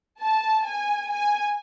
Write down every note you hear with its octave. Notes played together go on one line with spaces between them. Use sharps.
A5
G#5
G#5